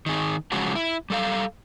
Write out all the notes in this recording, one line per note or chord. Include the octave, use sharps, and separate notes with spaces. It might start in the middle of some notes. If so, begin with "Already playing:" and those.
D#3 G#4
C#3 F3 F#3 G#3 F#4
E4
G3 A4 F5